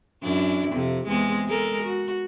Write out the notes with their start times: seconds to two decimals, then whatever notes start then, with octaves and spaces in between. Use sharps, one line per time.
0.23 F#2 D4 E4
0.73 F2 C3
1.08 E2 G#3 C4
1.47 G#3 A4 A#4
1.84 F#4